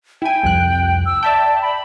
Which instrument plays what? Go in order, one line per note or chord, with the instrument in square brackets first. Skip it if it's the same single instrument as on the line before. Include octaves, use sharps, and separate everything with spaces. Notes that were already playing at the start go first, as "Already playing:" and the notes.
[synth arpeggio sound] E4 G#5 [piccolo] G5
[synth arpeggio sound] C2 F2 F#6
[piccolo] E6
[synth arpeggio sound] D5 E5 G5 [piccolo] A5
[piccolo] B5